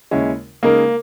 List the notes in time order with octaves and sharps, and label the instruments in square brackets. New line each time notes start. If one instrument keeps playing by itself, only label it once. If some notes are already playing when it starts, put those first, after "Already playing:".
[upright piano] D#2 C#3 G#3 C#4 E4
[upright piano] C#3 G#3 D#4 A#4 [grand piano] A#3